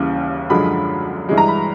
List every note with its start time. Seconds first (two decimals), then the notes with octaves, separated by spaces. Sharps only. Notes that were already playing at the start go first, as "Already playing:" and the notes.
Already playing: D#2 C#3 E3 G3
0.49 F#2 D3 F3 G#3 B5
1.29 G2 E3 G#3
1.37 A#5
1.48 B5